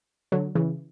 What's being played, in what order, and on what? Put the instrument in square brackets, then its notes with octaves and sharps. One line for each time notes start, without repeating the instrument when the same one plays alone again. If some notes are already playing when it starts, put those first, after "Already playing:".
[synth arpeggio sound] D3 F#3
C#3 E3